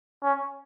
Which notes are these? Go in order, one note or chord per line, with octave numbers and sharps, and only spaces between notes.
C#4